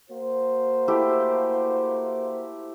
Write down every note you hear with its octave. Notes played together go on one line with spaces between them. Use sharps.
A#3 F#4 C5
A3 E4 G4